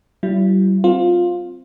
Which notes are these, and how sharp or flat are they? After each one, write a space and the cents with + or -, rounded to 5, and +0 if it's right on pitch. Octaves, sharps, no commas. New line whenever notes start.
G3 -40 E4 +30
C4 +0 F4 +10